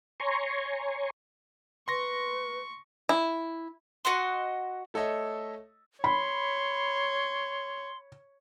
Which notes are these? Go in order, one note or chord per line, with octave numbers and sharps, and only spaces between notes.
C#5 G#5 A#5 C6 C#6
B4 C6 C#6 A#6
E4
F#4 D#5 F#5 C6
A3 A4 C#5 D#5 E5
C#5 B5 C6